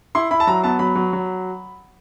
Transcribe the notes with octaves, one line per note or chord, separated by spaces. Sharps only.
E4 C6
E4 B5
A5
F#3 A#5
B3 A5
F#3 B5
F#3
F#3